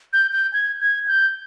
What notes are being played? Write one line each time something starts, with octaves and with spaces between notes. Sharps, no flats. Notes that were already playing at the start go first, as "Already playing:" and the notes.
G6
G6
G#6
G#6
G6